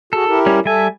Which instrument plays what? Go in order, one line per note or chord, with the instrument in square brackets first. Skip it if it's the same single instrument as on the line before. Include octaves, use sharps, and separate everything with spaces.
[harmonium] F#4 G#4 [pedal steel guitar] A4
[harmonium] E4 G4 A#4
[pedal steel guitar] G3 C#4
[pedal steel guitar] G3 G#5 [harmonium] A4 E5